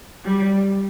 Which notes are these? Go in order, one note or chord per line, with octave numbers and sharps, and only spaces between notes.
G3